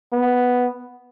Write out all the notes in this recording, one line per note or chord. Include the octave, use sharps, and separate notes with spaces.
B3